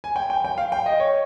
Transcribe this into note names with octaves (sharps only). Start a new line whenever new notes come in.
G#5
G5
G5
G5
F5
G5
D#5
C#5